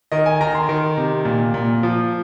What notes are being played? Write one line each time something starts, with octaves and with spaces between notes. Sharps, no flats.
D#3 D#5
G#5
D#3 A#5
C6
D#3
C3
A#2
A#2
F3